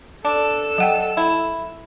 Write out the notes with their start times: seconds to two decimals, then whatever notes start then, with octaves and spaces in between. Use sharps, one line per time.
0.25 D4 A4 E6
0.78 F#3 F#5 G5
1.17 E4